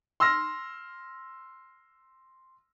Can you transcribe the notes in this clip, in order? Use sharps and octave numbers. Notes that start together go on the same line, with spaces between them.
C6 E6 F6 A#6